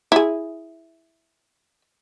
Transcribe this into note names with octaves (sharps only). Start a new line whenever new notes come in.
E4 G#4